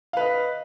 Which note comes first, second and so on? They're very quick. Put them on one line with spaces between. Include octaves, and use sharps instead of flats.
F5 B4 D#5